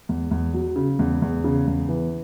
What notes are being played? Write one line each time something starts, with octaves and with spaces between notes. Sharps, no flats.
E2
E2
F#3
C#3
E2
E2
C#3
E2
E3